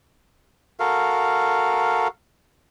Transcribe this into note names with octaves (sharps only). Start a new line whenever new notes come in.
F#4 A4 A#4 F5